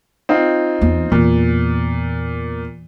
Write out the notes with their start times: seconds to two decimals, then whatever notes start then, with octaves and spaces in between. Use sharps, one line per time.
0.29 C4 D#4 F4
0.81 E2
1.12 E2 A#2